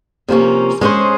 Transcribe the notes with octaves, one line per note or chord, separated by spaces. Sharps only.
C3 F3 A#3 C#4
G#3 C#4 G#4 C5